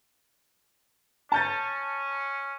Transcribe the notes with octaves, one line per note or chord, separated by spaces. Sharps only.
C#4 A5 G6 A6